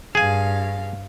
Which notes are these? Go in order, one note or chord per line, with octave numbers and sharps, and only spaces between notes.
G2 G#4 F5 G#5